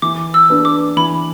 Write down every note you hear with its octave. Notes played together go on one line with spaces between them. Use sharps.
E3 D6
E6
B3 D4 B4
D6
E3 B5